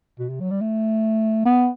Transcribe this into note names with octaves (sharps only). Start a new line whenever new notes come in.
B2
C3
F#3
G3
A3
B3